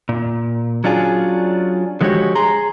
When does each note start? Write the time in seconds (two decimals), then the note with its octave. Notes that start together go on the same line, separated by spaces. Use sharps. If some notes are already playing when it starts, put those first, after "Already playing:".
0.09 A#2
0.84 F#3 C#4 D4 F4 G#4
2.01 D3 F3 G#3 F#4 G4 C#5
2.35 G#4 A#5 C6